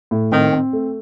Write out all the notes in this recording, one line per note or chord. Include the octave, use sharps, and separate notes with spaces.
A2
D#3 C4
C4
A3